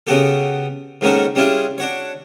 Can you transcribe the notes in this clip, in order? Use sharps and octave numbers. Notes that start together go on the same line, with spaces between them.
C#3 B3 F#4 G4 A4
G#2 D#3 A#3 C#4 F#4 A4
G3 C#4 D4 E4 F4 G#4
D4 F#4 C#5